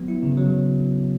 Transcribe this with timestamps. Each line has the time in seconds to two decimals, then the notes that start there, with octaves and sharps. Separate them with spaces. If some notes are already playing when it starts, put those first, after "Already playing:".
Already playing: F#3 B3
0.08 E4
0.23 C#3
0.37 F#3